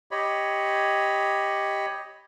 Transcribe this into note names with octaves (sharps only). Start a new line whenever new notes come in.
G4 C#5 D#5 B5